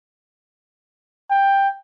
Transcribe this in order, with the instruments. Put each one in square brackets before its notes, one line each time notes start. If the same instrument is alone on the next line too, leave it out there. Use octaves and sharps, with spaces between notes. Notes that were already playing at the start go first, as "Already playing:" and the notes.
[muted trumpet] G5